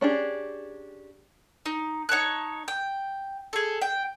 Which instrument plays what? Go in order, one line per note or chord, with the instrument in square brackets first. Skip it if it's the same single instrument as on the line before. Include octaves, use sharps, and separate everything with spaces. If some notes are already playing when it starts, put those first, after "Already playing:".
[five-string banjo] C#4 D4 G4 G#4
[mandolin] D#4
D#4 C#5 A5 F#6
G5
G#4 A4
G5